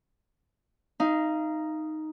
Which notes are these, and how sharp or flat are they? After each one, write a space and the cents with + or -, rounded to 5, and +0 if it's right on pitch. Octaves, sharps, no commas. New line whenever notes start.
D#4 +0 F5 -25